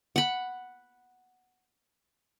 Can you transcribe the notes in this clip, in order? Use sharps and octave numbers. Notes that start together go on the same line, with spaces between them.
F#5 B5